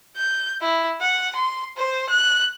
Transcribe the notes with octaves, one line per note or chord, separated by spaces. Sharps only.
G6
E4
F#5
C6
C5
F#6